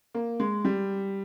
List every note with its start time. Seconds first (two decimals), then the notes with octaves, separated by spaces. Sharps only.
0.15 A#3
0.40 G#3
0.65 G3